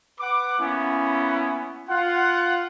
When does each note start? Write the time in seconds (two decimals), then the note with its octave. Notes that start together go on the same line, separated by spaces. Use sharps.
0.20 B4 F#5 D6
0.59 A#3 B3 C#4 E4
1.89 F4 F#5